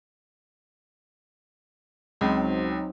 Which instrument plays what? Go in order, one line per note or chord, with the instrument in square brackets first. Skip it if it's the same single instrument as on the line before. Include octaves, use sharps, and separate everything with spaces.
[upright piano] C#2 [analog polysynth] F#3 C4 D#4